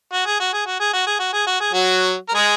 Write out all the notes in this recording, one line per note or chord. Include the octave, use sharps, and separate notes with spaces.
F#4
G#4
F#4
G#4
F#4
G#4
F#4
G#4
F#4
G#4
F#4
G#4
F#3 F#4
A#4
G#3 G#4